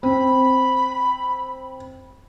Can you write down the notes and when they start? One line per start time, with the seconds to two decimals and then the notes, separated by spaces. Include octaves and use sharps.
0.03 C4 B5